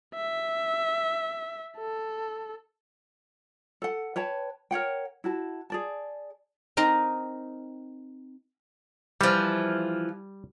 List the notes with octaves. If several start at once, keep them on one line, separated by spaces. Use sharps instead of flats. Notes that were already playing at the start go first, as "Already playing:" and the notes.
E5
A4
A4 F#5
B4 C#5 G5 A5
A#4 C#5 F#5 G5
E4 F#4 A5
G#4 D5 A5
C4 D#4 A#4 D#5
E3 F3 G3